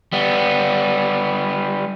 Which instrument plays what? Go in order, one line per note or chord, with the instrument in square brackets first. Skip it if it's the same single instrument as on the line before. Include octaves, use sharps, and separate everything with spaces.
[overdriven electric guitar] G3 B3